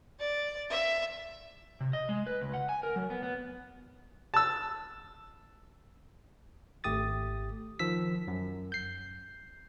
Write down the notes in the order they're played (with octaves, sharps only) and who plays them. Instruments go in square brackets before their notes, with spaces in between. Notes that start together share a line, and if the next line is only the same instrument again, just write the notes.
[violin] D5
E5
[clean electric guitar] C3
D#5
G#3
B4
C#2
F#5
G#5
A#4
F#3
B3
B3
[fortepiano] A5 E6
[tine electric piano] G#1 A3 G4 D#6 A6
D#3 F3 E6 B6
F#2
G6 C7